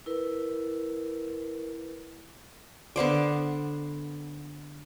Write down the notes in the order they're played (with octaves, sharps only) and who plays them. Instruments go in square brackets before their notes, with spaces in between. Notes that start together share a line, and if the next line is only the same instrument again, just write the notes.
[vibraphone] E4 A#4 B4
[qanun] D3 B3 C5 D5